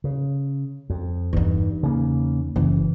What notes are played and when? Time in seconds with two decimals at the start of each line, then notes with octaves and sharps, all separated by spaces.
0.04 C#3
0.90 F2
1.33 E2 G2 D#4
1.83 C#3 A#3
2.56 F#1 C#3 E3